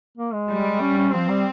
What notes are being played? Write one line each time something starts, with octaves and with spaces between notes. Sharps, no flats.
A#3
G#3
G3
C#4
C#4
F3 C4
G3